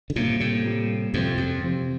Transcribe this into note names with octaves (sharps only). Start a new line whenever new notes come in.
D3
A2 C3 G3 A#3 F4
A2 C3
G3 A#3 F4
F2 A2 C3 F3 C4 G4 C5
F2
C3 F3 C4 G4 C5